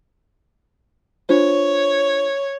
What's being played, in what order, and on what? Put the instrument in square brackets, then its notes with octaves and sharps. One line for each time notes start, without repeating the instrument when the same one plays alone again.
[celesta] D4 F4 C5 [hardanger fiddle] C#5